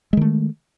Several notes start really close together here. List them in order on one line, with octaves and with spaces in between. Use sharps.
G#3 D#3 A3